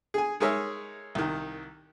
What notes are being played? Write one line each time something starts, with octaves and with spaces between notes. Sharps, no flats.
G#4 G#5
G#3 D#4 G#4 A#4 C#5 E5
C2 D#3